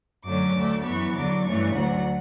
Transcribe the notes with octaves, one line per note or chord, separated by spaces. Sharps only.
F#2 D3 F#3 A3 C#4 D6
D2 D3 A3
F#2 E3 B3 C#6
E2 D3 F#3 D6
G2 E3 A3 C#4 C#6
D2 D3 F#3 F#5